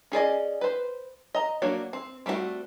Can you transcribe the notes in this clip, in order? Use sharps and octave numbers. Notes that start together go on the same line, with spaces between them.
C#4 G#4 D5 D#5
B4 C5
D#5 A#5
F#3 A#3 D4 F#4 C#5
C4
G3 A3 C4 D#4 F#4